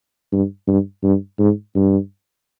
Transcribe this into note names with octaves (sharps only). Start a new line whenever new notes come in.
G2
G2
G2
G#2
G2